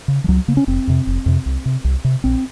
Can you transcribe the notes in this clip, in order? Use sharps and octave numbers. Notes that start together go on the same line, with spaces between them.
C#3
F3
C#2 F#3
C#3 A#3
C#4
F1 C4
F2 C3
F1
F2 C3
C2
C3
C2
C3
A#1 C4